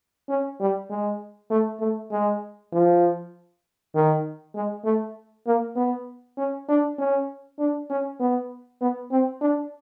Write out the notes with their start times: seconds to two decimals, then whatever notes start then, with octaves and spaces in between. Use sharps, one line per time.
0.29 C#4
0.60 G3
0.90 G#3
1.50 A3
1.80 A3
2.11 G#3
2.72 F3
3.95 D#3
4.55 G#3
4.85 A3
5.47 A#3
5.76 B3
6.37 C#4
6.68 D4
6.98 C#4
7.59 D4
7.90 C#4
8.19 B3
8.81 B3
9.11 C4
9.41 D4